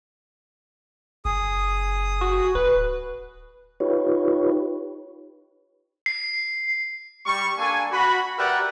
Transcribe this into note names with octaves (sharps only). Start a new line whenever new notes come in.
F#1 G#4 D#6
F#4
D1 B4
D#4 F4 G4 B4 C#5
C7
G3 C#6
A#3 D4 A4 G#5
F#4 B5
G4 A#4 B4 D5 E5 F#5